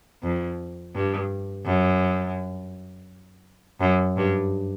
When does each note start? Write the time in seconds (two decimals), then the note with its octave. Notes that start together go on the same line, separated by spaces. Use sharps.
0.23 F2
0.95 G2
1.65 F#2
3.80 F#2
4.17 G2